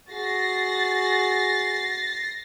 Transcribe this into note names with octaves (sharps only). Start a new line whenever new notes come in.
F#4 G#4 A6 A#6 C7